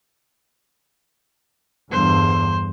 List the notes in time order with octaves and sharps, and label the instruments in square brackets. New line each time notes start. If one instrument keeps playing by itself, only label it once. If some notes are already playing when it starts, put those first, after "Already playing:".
[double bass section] E2 G2 D3 [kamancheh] C5